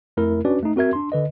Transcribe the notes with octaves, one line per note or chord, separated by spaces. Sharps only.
F2 A3 E4 A#4
C#4 D4 F#4 B4 D5
A3 D#4
C4 F#4 A#4 E5 G#6
D4 C6
D3 B4 D#5